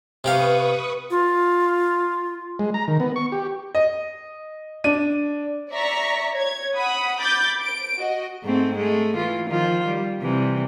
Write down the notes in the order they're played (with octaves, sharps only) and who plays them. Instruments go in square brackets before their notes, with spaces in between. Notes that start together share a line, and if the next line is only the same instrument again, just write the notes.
[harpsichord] C3 G4 F5 [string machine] B4 C#6 D#6
[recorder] F4
[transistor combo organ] G#3
A#5
D#3
B3
C#6
G4
[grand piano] D#5
D4 D#7
[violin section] D5 E5 A#5 C#6 A#6 B6
C#5 G#6
F#5 B5 D#6
B5 D6 G6 A6
D7
F#4 D#5
[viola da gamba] G#2 A3 C4
G#3 A3
E3 F4
D#3 F3 F4
G3
C3 E3 G3